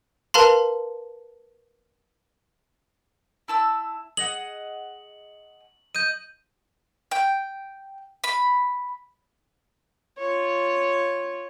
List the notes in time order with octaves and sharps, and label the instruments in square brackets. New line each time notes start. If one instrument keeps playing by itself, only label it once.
[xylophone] A#4 B4 F5 A5 A#5 C6
[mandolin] E4 A5 E6
[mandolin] G#4 D#5 F#5 [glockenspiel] F#7
[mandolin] D#5 [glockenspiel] G6 D#7
[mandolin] G5
B5
[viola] F4 C#5